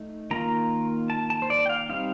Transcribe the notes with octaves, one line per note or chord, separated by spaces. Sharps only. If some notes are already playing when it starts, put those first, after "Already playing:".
Already playing: A3 D#4
D#3 A#3 F4 A#5
A5
A5
C5
D5
G5
F5
G3 C4 D#4 F5